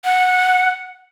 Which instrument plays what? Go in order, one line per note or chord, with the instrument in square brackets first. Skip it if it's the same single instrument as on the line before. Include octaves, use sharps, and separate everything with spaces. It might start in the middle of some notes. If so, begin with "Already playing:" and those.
[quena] F#5